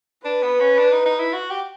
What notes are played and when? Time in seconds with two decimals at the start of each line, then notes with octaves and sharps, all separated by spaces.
0.25 D4 B4
0.43 B3
0.61 C#4
0.79 D4
0.92 D#4
1.06 D#4
1.19 E4
1.33 F#4
1.51 G4